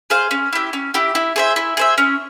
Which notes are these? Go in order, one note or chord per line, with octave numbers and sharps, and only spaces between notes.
G#4 C5 F5
C#4
E4 G4
C#4
E4 G4
E4
G#4 C5 E5
E4
G#4 C5 E5
C#4